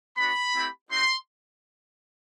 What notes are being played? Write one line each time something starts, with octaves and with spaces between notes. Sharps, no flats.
B3 D4 F#4 B5
A3 C4 E4 G4
C4 D#4 F#4 C6